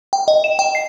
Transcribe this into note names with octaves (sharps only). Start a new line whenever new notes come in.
G5
D#5
E7
G5
C7